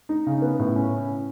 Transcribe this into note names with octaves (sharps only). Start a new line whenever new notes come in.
D#4
C#3
B3
A2
C#4